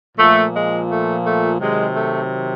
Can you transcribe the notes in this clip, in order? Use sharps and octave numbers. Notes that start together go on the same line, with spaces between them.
A#2 F3 A3
G#3
A3
A3
C3 D#3 F#3 G#3
A3